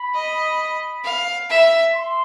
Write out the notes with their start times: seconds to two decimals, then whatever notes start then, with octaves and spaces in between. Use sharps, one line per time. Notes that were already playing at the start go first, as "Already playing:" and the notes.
Already playing: B5
0.14 D#5
1.04 F5
1.50 E5
1.94 C6